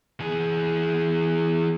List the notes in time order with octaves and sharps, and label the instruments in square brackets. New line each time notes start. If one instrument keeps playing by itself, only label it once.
[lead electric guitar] E3 G#4